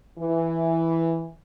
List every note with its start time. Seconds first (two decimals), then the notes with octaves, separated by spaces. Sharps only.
0.19 E3